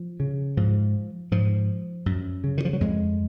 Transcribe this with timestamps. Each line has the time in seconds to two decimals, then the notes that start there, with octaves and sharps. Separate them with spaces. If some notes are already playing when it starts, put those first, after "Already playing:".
Already playing: F3
0.20 C#3
0.57 G#2 F3
1.31 G#2 F3
2.06 F#2
2.44 C#3
2.58 D#3
2.65 F3
2.73 F#3
2.81 F2 G#3